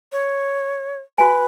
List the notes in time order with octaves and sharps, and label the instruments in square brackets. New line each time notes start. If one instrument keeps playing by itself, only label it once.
[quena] C#5
[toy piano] F#4 G#5 [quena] B4